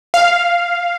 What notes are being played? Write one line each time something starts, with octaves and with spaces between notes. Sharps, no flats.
F5